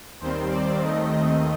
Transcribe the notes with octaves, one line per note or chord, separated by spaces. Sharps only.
D#2 D#3 G3 C4 C5
D5
D#2 D#3 A3 C4 D#5
D#5